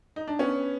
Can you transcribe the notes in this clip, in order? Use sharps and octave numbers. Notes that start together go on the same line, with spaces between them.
D#4
D4
B3 C#4